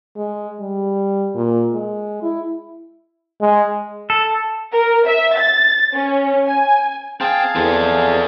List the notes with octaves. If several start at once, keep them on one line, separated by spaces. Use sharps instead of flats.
G#3
G3
A#2
G#3
E4
G#3
A4
A#4
E5
A6
C#4
G#5
C4 G#4 F5 G5 A5
E2 C4 A4